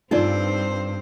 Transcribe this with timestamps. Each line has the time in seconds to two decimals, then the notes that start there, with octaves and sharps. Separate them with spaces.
0.11 G2 C4 D4 D#4 F4 A4 C5 D5